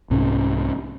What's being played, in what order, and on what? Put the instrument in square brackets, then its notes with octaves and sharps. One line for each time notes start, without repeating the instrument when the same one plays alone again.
[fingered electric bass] C2 G#2 C3 C#4